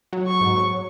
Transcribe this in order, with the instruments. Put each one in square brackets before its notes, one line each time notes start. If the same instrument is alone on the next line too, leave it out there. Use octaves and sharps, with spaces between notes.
[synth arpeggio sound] F#3
[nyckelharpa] C#6
[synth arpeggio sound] G#2